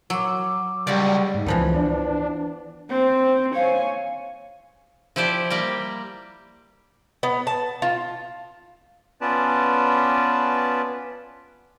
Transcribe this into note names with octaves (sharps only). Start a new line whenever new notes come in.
F#3 D6 E6
C#2 G3 F#4 D5
G#2
C#2 E3 F3 B3
D4
C4 C5
C#5 F5 G#5
F3 E4 G4 C5 D5
G3 A#3 G4
B3
A5
F4
B3 C#4 F4 B4 D5 A5